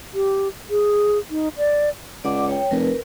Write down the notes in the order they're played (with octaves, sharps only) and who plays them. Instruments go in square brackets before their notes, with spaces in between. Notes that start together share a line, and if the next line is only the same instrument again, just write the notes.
[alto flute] G4
G#4
D#4
D5
[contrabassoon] C#2 [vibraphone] D5 F#5 D6
[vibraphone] C#5 G5
[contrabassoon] F1 [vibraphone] A#4 B4